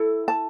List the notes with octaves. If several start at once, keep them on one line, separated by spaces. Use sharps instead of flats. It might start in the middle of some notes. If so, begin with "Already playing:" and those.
Already playing: E4 A4
A5